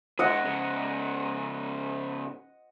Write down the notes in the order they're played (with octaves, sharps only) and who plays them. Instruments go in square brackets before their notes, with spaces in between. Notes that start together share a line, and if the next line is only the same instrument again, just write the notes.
[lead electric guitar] B2 G#3 [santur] D#5 F#5
[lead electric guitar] G#2 C#3